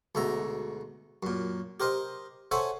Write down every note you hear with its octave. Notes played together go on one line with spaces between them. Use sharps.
D2 G#2 B2 E5 A#5
F#2 A#2
G4 A#4 C5 D#5
A4 C5 C#5 E5 F#5 G#5